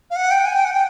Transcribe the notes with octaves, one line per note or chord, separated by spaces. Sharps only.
F5
F#5
G5
G#5
G5
F#5
G5